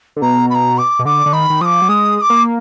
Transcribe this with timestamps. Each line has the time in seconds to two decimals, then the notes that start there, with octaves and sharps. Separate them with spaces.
0.16 D3
0.21 B2 A#5
0.49 B5
0.54 A#5
0.78 D6
0.99 B2
1.05 D3 D6
1.26 D3
1.33 D#3 B5
1.50 D#3
1.61 F3 D6 D#6
1.82 F#3
1.88 G#3 D#6
2.16 D#6
2.21 D6
2.30 A#3